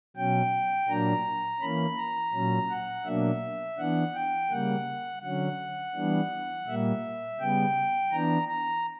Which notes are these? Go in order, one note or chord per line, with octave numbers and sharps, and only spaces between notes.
B2 F#3 C#4 G5
A#2 F#3 A#3 D4 A#5
E3 A#3 C#4 B5
A#5
A#2 F#3 C#4
F#5
B2 F#3 A#3 D4 E5
E3 B3 D4 F#5
G5
C#3 G3 A#3 F#5
D3 F#3 C#4 F#5
E3 G3 B3 D4
A#2 G3 A#3 E5
C#3 G3 B3 G5
E3 B3 D4 A#5
A#5